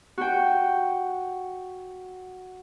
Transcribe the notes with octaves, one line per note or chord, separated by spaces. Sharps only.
F#4 G5